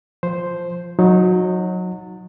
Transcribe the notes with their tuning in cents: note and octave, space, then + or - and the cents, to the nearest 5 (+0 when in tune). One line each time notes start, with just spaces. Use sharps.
F3 +0 C5 +0
F#3 -20 D#4 +0